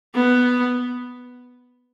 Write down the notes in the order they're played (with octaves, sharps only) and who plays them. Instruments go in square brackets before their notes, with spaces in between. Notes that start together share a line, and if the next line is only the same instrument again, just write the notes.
[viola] B3